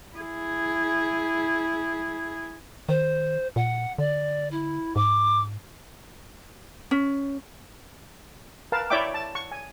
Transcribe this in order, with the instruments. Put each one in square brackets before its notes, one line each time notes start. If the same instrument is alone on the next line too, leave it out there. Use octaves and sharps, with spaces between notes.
[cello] E4 G#4
[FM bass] D#3 [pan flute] C5
[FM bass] A#2 [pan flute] F#5
[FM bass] D3 [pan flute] D5
[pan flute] E4
[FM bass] G#2 [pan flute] D6
[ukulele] C#4
[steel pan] A#4 B4 F5 A5
E4 C#5 D5 E5 G5 D6
A5
C#6
G#5